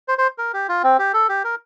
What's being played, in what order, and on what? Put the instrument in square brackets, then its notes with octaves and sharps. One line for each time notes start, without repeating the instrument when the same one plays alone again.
[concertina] C5
C5
A#4
G4
F4
C4
G4
A4
G4
A#4